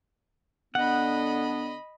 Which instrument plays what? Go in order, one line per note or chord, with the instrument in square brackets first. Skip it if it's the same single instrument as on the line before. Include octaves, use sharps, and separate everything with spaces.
[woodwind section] D3 B3 D4 [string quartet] D#5 B5 [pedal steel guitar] F#5